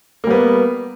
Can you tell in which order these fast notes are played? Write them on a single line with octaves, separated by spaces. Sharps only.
A#3 G3 B3